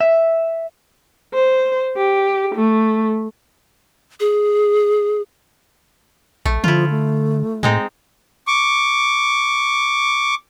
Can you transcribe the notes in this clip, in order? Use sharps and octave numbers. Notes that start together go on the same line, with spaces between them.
E5
C5
G4
A3
G#4
A#1 A3
D3 F3 E4 F4
A3
A2 G#3 C4 D#4
C#6 D6